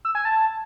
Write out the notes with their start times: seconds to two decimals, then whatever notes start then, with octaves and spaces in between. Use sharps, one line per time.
0.05 E6
0.15 G#5
0.25 A5